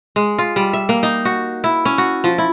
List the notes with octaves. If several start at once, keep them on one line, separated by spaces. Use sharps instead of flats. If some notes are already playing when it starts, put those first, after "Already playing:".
G#3
F4
G3
E5
A#3
D#4
F#4
E4
C#4
F#4
F3
E4